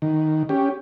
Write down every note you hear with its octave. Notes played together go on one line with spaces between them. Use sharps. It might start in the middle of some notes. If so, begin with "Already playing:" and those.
D#3
C#4 G4